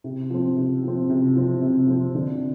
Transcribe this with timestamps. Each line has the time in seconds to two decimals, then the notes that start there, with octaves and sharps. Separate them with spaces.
0.04 C3
0.30 F3 C4
0.56 C3
0.84 F3 C4
1.09 C3
1.35 F3 C4
1.62 C3
1.87 F3 C4
2.15 D3